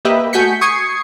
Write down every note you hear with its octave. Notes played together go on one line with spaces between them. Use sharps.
A#3 G4 B4 D#5 E5
A3 F#4 G#5 G6 B6 C#7
C#6 D#6 G#6 C7 C#7